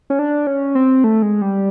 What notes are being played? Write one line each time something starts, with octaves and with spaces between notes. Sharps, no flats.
C#4
D4
C#4
C4
A3
G#3
G3